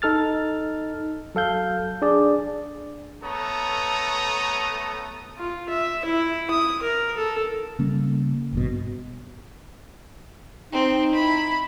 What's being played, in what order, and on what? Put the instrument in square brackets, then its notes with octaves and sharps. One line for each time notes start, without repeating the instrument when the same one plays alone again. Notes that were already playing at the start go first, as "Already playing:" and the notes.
[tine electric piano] D#4 A4 F6 A6
F#3 A4 F5 G6
D4 G#4 D5
[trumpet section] A3 B3 A4 C#5 A#5 D#6
[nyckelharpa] F4
E5
E4
D#6
A#4
A4
[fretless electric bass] C#3 G3 A#3 C#4
G#1 G2 B2
[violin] C4 [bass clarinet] D#4
[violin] E4 B5